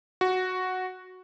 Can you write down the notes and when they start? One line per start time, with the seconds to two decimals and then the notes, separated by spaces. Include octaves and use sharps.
0.21 F#4